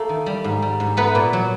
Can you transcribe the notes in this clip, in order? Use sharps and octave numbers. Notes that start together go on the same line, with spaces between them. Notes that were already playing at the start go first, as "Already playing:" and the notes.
Already playing: A3 A#3 A4
D#3
G3
G#2
G3
G#2
A3 B3 B4
A#2
F#3